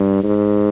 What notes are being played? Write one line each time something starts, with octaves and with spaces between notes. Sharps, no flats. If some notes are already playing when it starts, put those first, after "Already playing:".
Already playing: G2
G#2